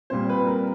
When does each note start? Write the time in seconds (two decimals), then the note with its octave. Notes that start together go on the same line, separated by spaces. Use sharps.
0.10 A#2 G3 C4 C5
0.29 B4
0.47 A#4